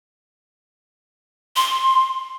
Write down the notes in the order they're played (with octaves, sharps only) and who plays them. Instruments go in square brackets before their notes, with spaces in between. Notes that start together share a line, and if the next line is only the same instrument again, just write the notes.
[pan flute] C6